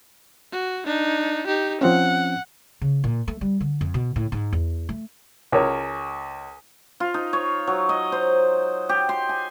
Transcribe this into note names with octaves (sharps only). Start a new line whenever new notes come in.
F#4
D4 D#4
D#4 G4
F3 C4 C#4 F#5
C#3
A#2
A3
G3
D3
F2
B2
A2
G#2
E2
A3
C#2 A#4 C#5
F4
D#4
C#5
F#3
D#5
C5
G4
C6
G#5